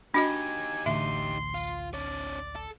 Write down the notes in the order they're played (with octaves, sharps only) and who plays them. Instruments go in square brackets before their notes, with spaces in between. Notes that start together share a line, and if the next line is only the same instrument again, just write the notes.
[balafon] D4 F#4 D#5 [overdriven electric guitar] D#4 G4 [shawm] G#5
[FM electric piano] A1 D2 [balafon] E5 [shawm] C6
[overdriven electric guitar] F4
[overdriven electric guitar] C#4 D4 [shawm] D5
[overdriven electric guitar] A4